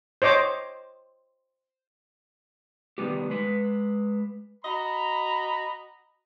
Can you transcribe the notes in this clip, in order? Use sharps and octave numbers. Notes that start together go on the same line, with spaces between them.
C5 C#5 D#5 D6
C3 D#3 E3 G3 B3 G4
G#3 B4
F#4 D#5 A#5 B5